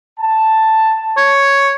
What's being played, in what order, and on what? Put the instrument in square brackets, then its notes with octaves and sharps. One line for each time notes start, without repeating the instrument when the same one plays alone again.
[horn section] A5
[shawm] C#5